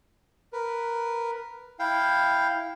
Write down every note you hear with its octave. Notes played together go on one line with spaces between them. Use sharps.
A#4 B4
E4 F5 G5